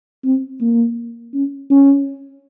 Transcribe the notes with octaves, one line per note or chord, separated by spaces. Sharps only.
C4
A#3
C#4
C#4